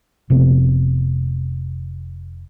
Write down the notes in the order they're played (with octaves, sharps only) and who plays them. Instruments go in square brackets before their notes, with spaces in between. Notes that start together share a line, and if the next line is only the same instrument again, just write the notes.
[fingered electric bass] F1 C3 A#3 B3